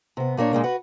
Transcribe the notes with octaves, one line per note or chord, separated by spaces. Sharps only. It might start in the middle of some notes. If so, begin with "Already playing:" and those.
C3 B3
A#2 A#3 D4 C#5
A#2 G#3 A#3 D4
F#4 B4